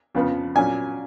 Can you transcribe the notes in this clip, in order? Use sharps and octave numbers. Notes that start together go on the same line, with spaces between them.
F2 C#3 F3 B3
A#2 F#3 C#4 G#5